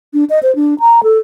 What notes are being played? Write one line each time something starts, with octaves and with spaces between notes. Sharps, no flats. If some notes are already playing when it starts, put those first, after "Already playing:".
D4
D#5
C5
D4
A#5
A4